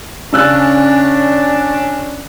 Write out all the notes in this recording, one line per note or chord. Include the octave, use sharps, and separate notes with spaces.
C#3 C#4 D4 E6 F#6